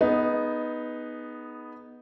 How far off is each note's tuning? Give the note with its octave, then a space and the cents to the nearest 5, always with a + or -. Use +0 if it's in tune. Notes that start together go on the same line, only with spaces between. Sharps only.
B3 +0 D#4 +0 G#4 +25